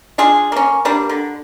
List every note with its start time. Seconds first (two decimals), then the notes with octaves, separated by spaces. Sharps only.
0.18 D4 F4 G#4
0.52 A#3 C#4
0.85 G3 A#3 D4
1.09 D3